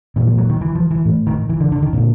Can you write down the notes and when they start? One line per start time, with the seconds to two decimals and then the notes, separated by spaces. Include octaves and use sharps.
0.16 A#2 E3
0.27 F3
0.38 F#3
0.50 D#3
0.61 E3
0.75 F3
0.91 E3
1.05 A2
1.27 D#3
1.49 E3
1.60 D3
1.72 D3
1.82 D#3
1.93 A#2 D3